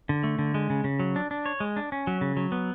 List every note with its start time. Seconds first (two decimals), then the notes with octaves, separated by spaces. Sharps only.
0.09 D3
0.23 A3
0.39 D3
0.54 G#3
0.70 C#3
0.84 C#3
1.00 F#3
1.16 D4
1.31 D4
1.46 C#5
1.60 G#3
1.77 D4
1.92 C#4
2.07 F#3
2.21 C#3
2.37 F#3
2.52 B3